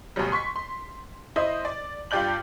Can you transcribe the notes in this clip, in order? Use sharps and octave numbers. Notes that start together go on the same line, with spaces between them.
D2 B2 F#3 G3
C6 C#6 B6
C6
E4 C5 D#5
D5
G2 F4 G4 D5 G6 F#7